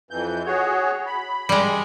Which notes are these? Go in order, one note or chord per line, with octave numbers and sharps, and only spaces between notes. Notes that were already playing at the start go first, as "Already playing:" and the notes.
F2 E3 G6
F#4 G#4 C#5
B5
G3 G#3